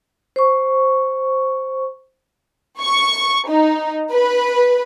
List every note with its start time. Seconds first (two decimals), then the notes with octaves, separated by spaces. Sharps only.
0.36 C5 C#6
2.81 C#6
3.49 D#4
4.12 B4